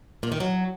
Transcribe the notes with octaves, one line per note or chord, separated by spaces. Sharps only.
A#2
D#3
F#3